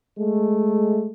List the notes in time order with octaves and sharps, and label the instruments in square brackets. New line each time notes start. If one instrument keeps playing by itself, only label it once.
[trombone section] G#3 A3